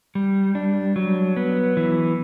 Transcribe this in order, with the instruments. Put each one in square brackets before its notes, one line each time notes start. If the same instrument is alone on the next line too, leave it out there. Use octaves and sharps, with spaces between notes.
[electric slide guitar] G3
D4
F#3
B3
E3